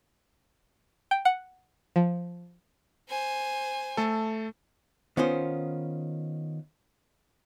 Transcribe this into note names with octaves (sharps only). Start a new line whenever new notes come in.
G5
F#5
F3
C5 G#5
A3 A4
D#3 B3 C#4 F4 C5